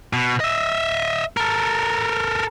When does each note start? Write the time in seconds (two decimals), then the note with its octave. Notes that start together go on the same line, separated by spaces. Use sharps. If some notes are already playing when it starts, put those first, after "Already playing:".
0.13 B2
0.40 D#5 E5
1.37 A4 A#4